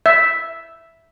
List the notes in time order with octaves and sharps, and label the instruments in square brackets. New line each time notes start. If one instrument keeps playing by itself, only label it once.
[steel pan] E5